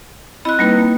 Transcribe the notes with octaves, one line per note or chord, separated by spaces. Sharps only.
C4 E4 D#5 B5 F#6
G3 A#3 D#4 B4